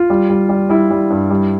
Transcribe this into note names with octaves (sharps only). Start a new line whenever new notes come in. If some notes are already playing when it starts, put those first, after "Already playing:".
Already playing: F4
G3
G3
G3
G3 E4
G3
G2
G3